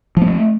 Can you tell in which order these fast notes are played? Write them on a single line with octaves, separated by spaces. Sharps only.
F3 A#3 A3